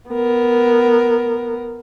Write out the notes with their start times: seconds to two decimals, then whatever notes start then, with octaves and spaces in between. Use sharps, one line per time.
0.10 B3 A#4